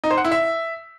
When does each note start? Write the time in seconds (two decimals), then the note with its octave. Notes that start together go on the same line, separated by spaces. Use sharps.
0.04 D#4
0.11 C5
0.18 F#5
0.25 E4
0.32 E5